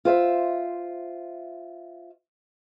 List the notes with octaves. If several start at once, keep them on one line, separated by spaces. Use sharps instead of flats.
F4 C5 E5